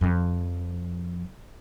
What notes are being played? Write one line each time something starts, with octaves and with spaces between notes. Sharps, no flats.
F2 F3